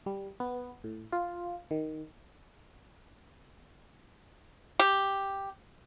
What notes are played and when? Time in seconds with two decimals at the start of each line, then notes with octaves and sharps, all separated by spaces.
0.06 G3
0.40 B3
0.84 A2
1.12 F4
1.71 D#3
4.79 G4